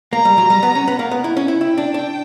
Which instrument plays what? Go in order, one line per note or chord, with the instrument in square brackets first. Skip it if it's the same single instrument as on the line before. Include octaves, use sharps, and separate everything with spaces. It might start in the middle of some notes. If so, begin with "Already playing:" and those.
[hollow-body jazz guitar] A#3 [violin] A#5
[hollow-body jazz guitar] G3
F#3
G3
B3
C#4
B3
A#3
B3
E4
C#4
E4
[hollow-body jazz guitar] E4 [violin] G5
[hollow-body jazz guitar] D4
D4